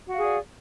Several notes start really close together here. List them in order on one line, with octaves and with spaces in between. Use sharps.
F#4 F5 G#4 D5